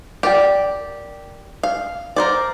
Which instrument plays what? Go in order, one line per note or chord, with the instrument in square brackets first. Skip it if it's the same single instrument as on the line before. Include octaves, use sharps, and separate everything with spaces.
[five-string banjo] G4 [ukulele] A#4 D5 G5
[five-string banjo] F5
A#4 C5 D5